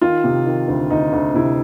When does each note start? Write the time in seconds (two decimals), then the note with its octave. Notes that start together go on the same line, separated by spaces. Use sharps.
0.01 D#3 F4
0.24 C3
0.46 D#3
0.68 D2
0.90 D2 D#4
1.13 D2
1.34 C3 E4